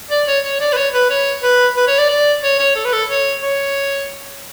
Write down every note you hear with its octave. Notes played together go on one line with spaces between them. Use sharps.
D5
C#5
C#5
D5
B4
C#5
B4
C#5
B4
B4
C#5
D5
D5
C#5
C#5
A4
B4
A4
C#5
C#5